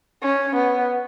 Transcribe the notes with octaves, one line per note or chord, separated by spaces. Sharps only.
C#4
B3